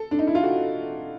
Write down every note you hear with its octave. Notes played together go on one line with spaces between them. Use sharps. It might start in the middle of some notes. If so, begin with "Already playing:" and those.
Already playing: A4
D4
D#4
E4
F4
F#4